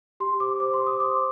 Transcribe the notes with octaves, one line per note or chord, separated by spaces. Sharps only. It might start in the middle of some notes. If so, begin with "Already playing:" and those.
G4 C6
C5 D6
C5 D6
C6
C5
D#6
C5 D6